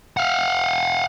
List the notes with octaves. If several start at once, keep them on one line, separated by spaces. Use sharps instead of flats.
F5 F#5